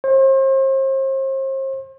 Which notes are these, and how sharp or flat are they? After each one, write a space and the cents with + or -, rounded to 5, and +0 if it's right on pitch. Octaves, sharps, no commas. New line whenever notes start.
C5 +40